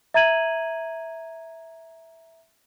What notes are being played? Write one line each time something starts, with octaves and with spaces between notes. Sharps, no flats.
E5 A#5 G#6 D#7 F#7